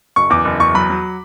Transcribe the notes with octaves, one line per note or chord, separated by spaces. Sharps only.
F#1 C#6
E2 D6
F#1
E2 C#6
F#3 B5
F#3